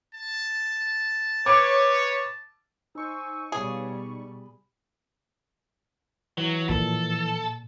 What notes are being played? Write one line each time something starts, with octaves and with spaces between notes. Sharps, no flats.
A5
B4 C#5 D6
D#4 C5 G#5 C#6 E6
B2 G3 G#4 B4 C#5 F5
B5
E3 F#3
A#2 F3 A4